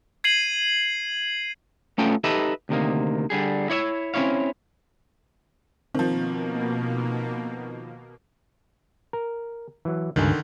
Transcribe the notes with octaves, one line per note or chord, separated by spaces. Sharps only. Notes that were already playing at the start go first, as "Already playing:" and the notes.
G#6 C7 D#7 F#7
A3 B3 C#4 F4 A4 G5
D#4 G4 A4 B4 D#5 E5
D2 C3 D#3 A#3
D3 G3 G#4
E4 C#5 D5 E5
C4 C#4 E4 C#5 F5
B2 D#3 F3 A#3 C4
A#4
E3 F#3
C#2 G2 D3 D#3 G#5